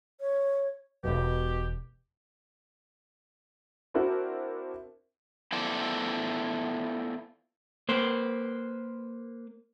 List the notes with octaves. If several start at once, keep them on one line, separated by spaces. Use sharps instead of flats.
C#5
E1 B2 G4
C4 D4 E4 F#4 A#4
B3 E4 F4 A4 C5 D5
A#3 B4 C5